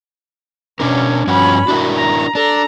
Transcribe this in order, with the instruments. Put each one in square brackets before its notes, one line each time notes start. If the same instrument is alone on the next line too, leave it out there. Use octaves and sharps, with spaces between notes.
[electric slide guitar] B2 D4 A#4 [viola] C#4
[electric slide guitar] G2 F3 F#4 [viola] C#4 B5
[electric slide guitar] D4 E4 A#4 [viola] F#4
[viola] A#5
[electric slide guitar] D4 [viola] A4 A#5